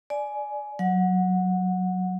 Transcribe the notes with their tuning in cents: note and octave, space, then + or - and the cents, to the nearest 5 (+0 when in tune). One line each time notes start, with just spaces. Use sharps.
D5 +5 G#5 +15
F#3 +0 F#5 -15